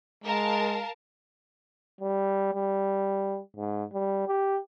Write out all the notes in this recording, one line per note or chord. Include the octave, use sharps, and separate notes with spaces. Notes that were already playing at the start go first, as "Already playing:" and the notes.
G#3 A#4 F5 A5
G3
G3
G#2
G3
G4